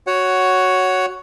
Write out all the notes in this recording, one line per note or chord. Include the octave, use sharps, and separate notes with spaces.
F#4 C#5 F#5